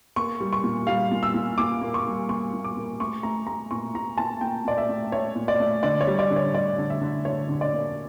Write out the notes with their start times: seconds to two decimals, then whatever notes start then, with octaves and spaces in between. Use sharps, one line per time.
0.16 A#3 C#6
0.41 G3
0.53 C#6
0.64 A#2
0.87 G3 F5
1.11 A#2
1.23 E6
1.34 A#2
1.58 A#2 D6
1.81 A#3
1.94 C#6
2.06 G3
2.29 A#3 C#6
2.53 A#2
2.64 D6
2.77 A#3
3.00 A3 C#6
3.23 A3 A#5
3.47 A3 A#5
3.71 A#2 C#6
3.94 A#2 A#5
4.18 A#2 A5
4.41 A#2 G5
4.65 A#2 D5
4.78 E5
4.89 A3
5.12 A3 C#5
5.36 A#2
5.48 D5
5.60 A3
5.83 D3 D5
6.01 C#5
6.07 G3
6.19 D5
6.31 D3
6.36 C#5
6.54 G3 D5
6.79 D3
6.90 E5
7.01 D3
7.25 D3 C#5
7.49 D3
7.61 D5
7.73 A#3